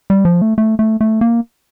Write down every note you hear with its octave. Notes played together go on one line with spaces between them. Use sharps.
G3
F3
A3
A3
A3
A3
A#3